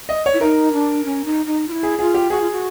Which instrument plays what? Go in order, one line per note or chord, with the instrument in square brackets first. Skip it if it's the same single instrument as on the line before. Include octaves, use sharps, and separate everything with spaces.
[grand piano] D#5
C#5
[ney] E4
[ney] D#4 [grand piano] A#4
[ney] D4
C#4
D#4
D#4
F4
E4
[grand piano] G#4
[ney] F4 [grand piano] G#4
[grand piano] G4
[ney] F#4 [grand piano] G#4
[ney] F4
F#4